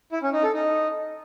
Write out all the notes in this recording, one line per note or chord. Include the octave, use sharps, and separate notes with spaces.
E4
C#4
D#4
A4
D#4